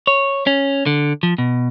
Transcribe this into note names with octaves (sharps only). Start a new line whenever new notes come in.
C#5
C#4
D3
F3
B2